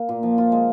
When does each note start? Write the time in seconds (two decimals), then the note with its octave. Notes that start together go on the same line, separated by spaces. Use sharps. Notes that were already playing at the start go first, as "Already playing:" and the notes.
Already playing: A#3
0.09 A#2
0.23 F3
0.38 F4
0.52 G#3